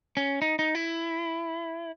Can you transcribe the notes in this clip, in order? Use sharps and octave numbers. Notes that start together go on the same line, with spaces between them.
C#4
D#4
D#4
E4